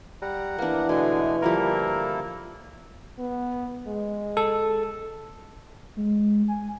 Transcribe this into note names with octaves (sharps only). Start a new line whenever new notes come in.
G3 F#5 A#5
E3 A#3 B3 D4
B2 D3 G#3 A3 G#4 G#5
D3 F3 G3 A#3 E4 A4 A#4
B3
G#3
A4
G#3
G#5